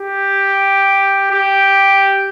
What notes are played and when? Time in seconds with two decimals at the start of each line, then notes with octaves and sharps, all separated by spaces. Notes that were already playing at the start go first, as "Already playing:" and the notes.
Already playing: G4
1.31 G4